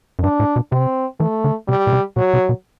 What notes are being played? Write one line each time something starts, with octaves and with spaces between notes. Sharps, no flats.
F#2
G2 D4
A2
B2
C3 C4
E3 A3
D3
C3 G3
B2
C3
B2 F#3
C3
B2